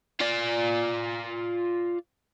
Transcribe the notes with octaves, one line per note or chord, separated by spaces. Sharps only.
F4 D5